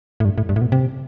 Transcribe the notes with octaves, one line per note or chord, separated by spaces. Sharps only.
A2
G2
A2
G2
A2
B2
C3